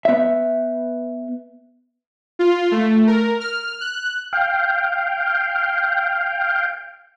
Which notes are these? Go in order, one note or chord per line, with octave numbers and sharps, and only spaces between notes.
B3 E5
F4
A3
A#4
F6
F#6
F5 G5